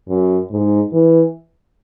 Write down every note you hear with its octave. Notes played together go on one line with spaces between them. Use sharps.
F#2
G#2
E3